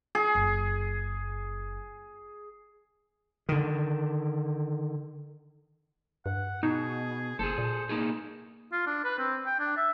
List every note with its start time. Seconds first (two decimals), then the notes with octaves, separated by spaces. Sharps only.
0.15 G#4
0.35 F#1
3.49 D3 D#3
6.26 G2 F#5
6.63 B2 D#4 G#4
7.39 F#1 G#4 A4 C5
7.58 A#2
7.89 A#3 D#4 G#4
8.72 F4
8.86 D4
9.04 B4
9.18 C4
9.46 G5
9.60 D4
9.77 E5